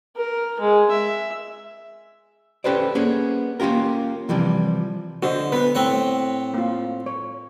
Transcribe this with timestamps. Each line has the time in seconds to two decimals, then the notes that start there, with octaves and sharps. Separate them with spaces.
0.17 A#4
0.60 G#3
0.91 E5
2.64 C#4 G4 A4 B4 C5 D5
2.95 A#3 B3 C#4 G#4
3.60 A#3 C#4 F4 G4 A#4
4.29 C3 E3 F3 G3
5.23 D3 F#4 C5 D#5
5.52 B3 B4
5.75 A2 C4 F#5
6.54 A#3 F4
7.06 C#5